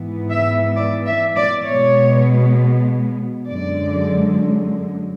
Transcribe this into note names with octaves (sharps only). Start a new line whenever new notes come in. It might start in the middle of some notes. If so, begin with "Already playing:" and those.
Already playing: G#2 E3 B3
E5
D5
E5
D5
B2 G#3 B3 C#5
F#2 D3 G#3 D5